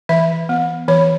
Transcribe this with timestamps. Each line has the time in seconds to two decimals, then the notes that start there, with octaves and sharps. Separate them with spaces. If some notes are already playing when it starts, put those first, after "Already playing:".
0.09 E3 E5
0.49 B3
0.88 E3 C#5